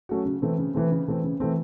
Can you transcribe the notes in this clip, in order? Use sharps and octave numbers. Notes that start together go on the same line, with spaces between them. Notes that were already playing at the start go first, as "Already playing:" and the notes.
F#3 A3 C#4 F#4
C#3
E3 A3 C4
C#3
E3 A3 C4
C#3
E3 A3 C4
C#3
E3 A3 C4